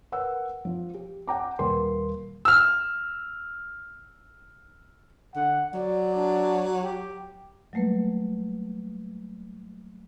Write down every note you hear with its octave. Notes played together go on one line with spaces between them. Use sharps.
A#4 B4 F#5 E6
F3
G4
F#5 G5 A#5 D6
D#1 A#2 A#3 A#4 B4 C6
E6 F6
D3 F#5
F#3 D5
D4
G4
F#3 G3 A3 A#3 B4